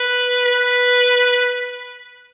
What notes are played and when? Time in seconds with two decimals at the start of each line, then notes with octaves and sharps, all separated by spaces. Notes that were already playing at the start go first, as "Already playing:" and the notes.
Already playing: B4
0.45 B4